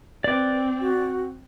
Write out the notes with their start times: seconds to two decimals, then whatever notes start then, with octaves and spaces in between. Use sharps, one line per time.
0.24 C4 B4 D5 D6
0.81 F#4